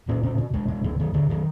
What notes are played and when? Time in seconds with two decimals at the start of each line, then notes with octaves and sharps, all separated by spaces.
0.08 A#2 C#4
0.23 B2 C#4
0.38 B2
0.53 B2 G#3
0.68 B2
0.84 B2 F3
0.99 B2 D#3
1.14 B2 D3
1.29 B2 D#3